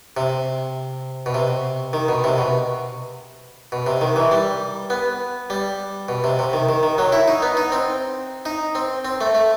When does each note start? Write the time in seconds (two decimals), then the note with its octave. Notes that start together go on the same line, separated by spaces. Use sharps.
0.17 C3
1.26 B2
1.34 C3
1.93 D#3
2.08 B2
2.24 C3
2.38 B2
3.72 B2
3.87 C3
4.01 D#3
4.16 E3
4.31 G3
4.90 B3
5.50 G3
6.09 B2
6.24 C3
6.39 C3
6.53 D#3
6.69 D#3
6.83 D#3
6.98 F#3
7.12 E4
7.28 D#4
7.42 B3
7.57 D#4
7.72 C4
8.45 D#4
8.75 C4
9.05 C4
9.21 A3
9.35 A3